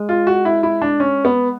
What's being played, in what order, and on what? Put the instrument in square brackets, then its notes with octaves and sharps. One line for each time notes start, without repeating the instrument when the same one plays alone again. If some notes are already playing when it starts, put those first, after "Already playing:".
Already playing: [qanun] G#3
[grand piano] F4
F#4
E4
E4
D4
C#4
B3